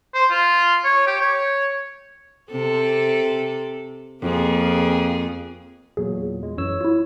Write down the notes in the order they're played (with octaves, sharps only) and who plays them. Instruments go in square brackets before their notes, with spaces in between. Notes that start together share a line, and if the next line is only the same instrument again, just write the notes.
[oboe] C5
F4
C#5
G4
C#5
[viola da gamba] C3 C4 A4
F2 A#3 G#4
[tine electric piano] E2 A#2 F#3 [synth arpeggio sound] G#4
[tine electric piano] G#3
[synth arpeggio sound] F#2 [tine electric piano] E3 C#5 E6
[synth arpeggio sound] E4 F4